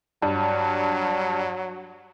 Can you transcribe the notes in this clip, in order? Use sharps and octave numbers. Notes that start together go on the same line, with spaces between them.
G2 F#3